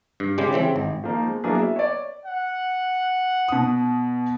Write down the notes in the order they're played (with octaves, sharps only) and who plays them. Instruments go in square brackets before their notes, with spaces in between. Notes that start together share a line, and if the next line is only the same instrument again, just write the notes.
[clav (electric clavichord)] G2
C#3 G3 G#3 G4
C#3 E3 C4
G#1
[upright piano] F3 A#3 D#4
G#3
F#3 A#3 B3 D4 E4 G#4
E5
C#5 D5
[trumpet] F#5
[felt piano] B2 D#6